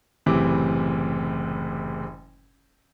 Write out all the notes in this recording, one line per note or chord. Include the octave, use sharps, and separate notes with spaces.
F#1 A2 C3 E3 C4 D6